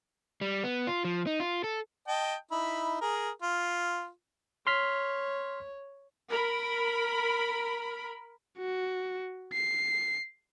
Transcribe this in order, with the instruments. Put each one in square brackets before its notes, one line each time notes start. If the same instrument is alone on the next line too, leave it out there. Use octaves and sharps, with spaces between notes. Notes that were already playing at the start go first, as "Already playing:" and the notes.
[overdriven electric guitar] G3
B3
F4
F3
D#4
F4
A4
[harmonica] D#5 G5 A5
D#4 E4 B5
G#4 A#4
F4
[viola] C#5 [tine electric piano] C6 F6 B6
[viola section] A#4 B5
[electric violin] F#4
C7